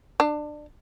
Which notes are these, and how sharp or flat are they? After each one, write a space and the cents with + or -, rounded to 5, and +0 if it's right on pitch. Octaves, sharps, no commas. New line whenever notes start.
D4 +25